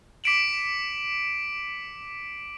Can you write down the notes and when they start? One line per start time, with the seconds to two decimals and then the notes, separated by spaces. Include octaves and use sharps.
0.24 D6 B6 C#7 D7 E7 F#7